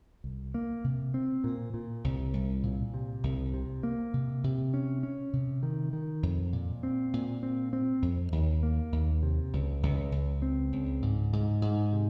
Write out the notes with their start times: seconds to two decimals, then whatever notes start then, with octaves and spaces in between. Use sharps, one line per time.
0.24 C2
0.54 A#3
0.84 C3
1.14 C4
1.44 A#2
1.74 A#2
2.04 C2
2.33 C2
2.63 A#2
2.94 C3
3.23 C2
3.54 C3
3.83 A#3
4.13 C3
4.44 C3
4.74 C#4
5.03 C#4
5.33 C3
5.63 D#3
5.93 D#3
6.23 F2
6.53 A#2
6.83 C4
7.13 A#2
7.43 C4
7.73 C4
8.02 F2
8.32 D#2
8.63 A#3
8.92 D#2
9.23 C3
9.53 C#2
9.83 C#2
10.12 C#2
10.42 C4
10.73 C#2
11.02 G#2
11.33 G#2
11.62 G#2
11.92 C3